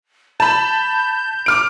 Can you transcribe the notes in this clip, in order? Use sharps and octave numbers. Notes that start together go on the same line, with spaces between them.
A5 B5 G6
D6 F6 D7